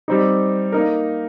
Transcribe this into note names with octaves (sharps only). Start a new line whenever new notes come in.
G3 C4 D#4
A#3 D#4 A#4